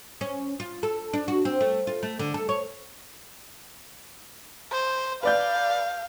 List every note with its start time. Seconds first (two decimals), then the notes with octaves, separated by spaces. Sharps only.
0.21 C#4
0.60 F4
0.83 A4
1.13 D4
1.28 F#4
1.45 C4
1.61 A3
1.87 F4
2.03 A3
2.19 D3
2.34 A4
2.49 C#5
4.72 C5
5.23 B4 D5 F5 G6